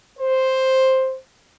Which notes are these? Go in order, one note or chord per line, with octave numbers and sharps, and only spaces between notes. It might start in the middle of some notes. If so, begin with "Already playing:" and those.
C5